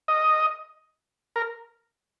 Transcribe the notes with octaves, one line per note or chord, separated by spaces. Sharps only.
D#5
A#4